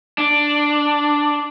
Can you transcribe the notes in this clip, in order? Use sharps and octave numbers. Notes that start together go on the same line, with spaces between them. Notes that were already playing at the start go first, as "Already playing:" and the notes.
D4